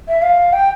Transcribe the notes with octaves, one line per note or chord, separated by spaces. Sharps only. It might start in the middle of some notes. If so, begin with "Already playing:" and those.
E5
F5
G5